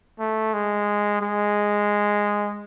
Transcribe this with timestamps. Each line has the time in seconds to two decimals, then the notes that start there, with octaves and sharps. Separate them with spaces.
0.19 A3
0.53 G#3
1.21 G#3